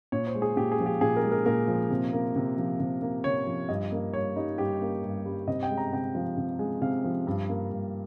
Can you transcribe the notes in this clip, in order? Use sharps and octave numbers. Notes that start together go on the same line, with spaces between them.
A#2 C#5
C5
G#3
G#4
A#2 G4
G#4
F3
G4
A#2 G#4
A#4
G#3
A#4
A#2 A#4
F3
C3
A#3
C3
F3
C3
A#3
C3 C#5
F3
G2 D#5
A#3
G2 C#5
G3 D#4
G2 G4
A#3
G2
G3
C3 D#5
G5
G#3
A#5
C3 G5
F3
C3
G#3
C3 F5
F3
G2
A#3
G2